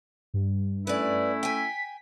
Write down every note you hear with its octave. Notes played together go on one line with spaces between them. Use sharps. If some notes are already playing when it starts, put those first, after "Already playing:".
G2
A3 C#4 E4 B4 D5
G5 G#5 B6